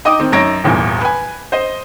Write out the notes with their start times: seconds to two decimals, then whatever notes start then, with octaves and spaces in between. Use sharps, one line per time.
0.05 D#4 D#5 G5 D6 D#6
0.19 D#3 C4
0.32 F#2 D#4 C#5 A#6 D7
0.64 D#1 G#1 E2 A#2
1.01 B4 G#5
1.52 C5 D#5